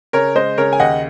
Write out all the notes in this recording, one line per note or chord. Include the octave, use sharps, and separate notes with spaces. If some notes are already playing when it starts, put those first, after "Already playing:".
C#3 A#4 C#5
G#3 C5 D#5
C#3 A#4 C#5
G#5
D#2 D#5 F#5